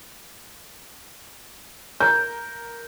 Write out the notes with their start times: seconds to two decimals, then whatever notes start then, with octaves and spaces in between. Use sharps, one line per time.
2.00 A#4 G6